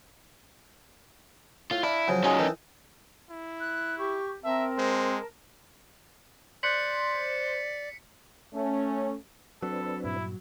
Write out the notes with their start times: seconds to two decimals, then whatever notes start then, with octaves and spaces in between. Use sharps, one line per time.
1.71 A2 F4
1.83 D4 E4 D5 F5
2.08 C#3 F3 F#3
2.24 F#3 C#4 D#4 F4 G#4
2.38 D#3 E3 A4
3.30 E4
3.61 F#6
3.98 G4 C#6
4.44 C4 A#4 E5 A5
4.78 G#3 C5
6.63 C5 D5 C6 F#6 B6 C#7 F#7
8.54 A3 C#4
9.62 F#3 C4 D4 A4 B4
10.04 G2 A#2 E4